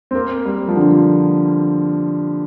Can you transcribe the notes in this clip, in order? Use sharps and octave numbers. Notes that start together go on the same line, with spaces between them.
C4
A#3
G3
F3
D3